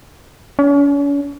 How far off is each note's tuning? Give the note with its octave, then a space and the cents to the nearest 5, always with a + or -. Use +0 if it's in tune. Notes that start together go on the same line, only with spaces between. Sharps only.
C#4 +40